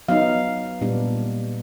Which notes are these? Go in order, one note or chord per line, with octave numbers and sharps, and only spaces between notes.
F#3 B3 D#4 F5
A#2 G3 B3 D4